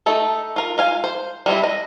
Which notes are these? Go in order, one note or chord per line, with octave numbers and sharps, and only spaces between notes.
A3 D#4 A4
F4 A#4
F4 F5 G#5
C5
G3 G#3 C4 E4
D#5